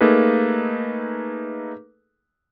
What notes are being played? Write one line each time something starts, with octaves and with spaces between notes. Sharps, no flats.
A3 A#3 D#4 G#4 A4 B4